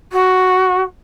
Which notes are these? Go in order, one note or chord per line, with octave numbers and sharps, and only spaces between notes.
F#4